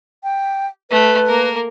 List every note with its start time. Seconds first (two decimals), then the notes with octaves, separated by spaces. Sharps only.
0.24 G5
0.91 A3 B4
1.26 A#3 A#4